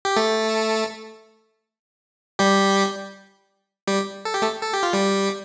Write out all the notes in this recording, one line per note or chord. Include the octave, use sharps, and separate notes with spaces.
G4
A3 A4
G3 G4
G3 G4
A4
G4
A3 A4
A4
G4
F4
G3 G4